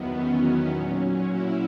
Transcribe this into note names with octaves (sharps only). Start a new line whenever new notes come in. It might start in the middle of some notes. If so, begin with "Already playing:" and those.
Already playing: E2 D#3 F#3 B3
C#4
A#2 F#3
E4